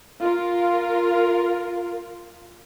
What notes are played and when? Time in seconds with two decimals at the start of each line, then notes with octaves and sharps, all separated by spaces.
0.20 F4 A#4